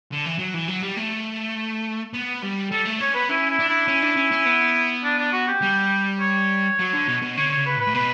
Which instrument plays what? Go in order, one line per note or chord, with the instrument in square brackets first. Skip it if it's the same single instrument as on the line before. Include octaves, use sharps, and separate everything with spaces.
[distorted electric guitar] D3
E3
F#3
E3
F#3
G3
A3
B3
G3
[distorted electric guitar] G3 [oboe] A4
[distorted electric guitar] A3
[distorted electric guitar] C#4 [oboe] C#5
[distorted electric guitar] B3 [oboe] B4
[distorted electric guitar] C#4 [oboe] E4
[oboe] E4
[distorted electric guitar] D4
[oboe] E4
[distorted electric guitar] C#4
D4
C#4
C#4
B3
[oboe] D4
D4
F#4
G4
[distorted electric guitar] G3
[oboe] C#5
[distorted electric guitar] F#3
D3
B2
B2
[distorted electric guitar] D3 [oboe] C#5
[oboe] C#5
[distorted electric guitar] C#3
[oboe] B4
[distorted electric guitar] A2
[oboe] B4
[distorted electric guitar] A2
[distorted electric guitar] B2 [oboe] B4